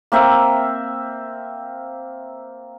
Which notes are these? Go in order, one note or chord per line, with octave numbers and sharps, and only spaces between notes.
A#3 C4 E5